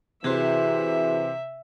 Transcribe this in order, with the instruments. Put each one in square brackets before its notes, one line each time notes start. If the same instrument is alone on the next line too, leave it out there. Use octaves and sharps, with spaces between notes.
[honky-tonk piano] C3 C5 [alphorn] E3 [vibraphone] F#4 G#4 [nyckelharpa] E5